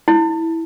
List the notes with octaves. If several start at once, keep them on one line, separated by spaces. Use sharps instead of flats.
E4